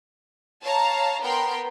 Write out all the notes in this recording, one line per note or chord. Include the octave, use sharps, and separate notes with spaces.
C#5 F5 A5 A#5
B3 A#4 G5 C6